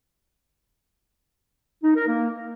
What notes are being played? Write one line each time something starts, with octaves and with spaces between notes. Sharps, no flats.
D#4
A#4
A#3